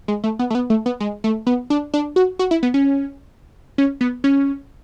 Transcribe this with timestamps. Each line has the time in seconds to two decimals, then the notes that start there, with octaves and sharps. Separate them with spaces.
0.08 G#3
0.24 A3
0.39 B3
0.50 A3
0.55 B3
0.70 A3
0.86 B3
1.00 G#3
1.24 A3
1.47 B3
1.70 D4
1.94 D4
2.16 F#4
2.39 F#4
2.51 E4
2.63 B3
2.74 C#4
3.78 C#4
4.01 B3
4.24 C#4